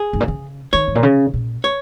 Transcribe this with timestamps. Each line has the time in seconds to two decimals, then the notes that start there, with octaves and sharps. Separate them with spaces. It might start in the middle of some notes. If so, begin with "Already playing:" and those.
Already playing: G#4
0.13 G#2
0.20 A#2
0.28 C#3
0.73 D#3 C#5
0.88 G#2
0.95 A#2
1.03 C#3
1.33 A#2
1.64 C#5